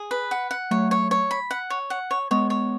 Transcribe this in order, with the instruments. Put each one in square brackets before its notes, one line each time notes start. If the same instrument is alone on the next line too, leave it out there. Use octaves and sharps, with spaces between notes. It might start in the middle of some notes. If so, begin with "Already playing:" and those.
Already playing: [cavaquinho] G#4
B4
F#5
F#5
[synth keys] F#3 A3 [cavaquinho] C#5
[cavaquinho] C#5
C#5
B5
F#5
C#5
F#5
C#5
[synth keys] G#3 B3 [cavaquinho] C#5
[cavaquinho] C#5